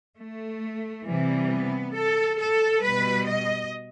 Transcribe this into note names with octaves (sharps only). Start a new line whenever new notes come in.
A3
C3 E3 G3
B3
A4
A4
B2 G3 B4
D#5